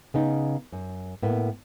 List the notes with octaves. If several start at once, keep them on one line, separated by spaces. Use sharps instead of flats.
C#3 B3 D#4
F#2
A2 A#3 B3